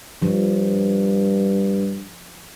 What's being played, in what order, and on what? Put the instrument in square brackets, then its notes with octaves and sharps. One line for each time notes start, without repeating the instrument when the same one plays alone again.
[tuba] G2 [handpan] F3